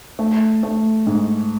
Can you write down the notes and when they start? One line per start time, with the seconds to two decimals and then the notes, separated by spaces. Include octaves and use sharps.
0.19 A3
0.63 A3
1.07 G#2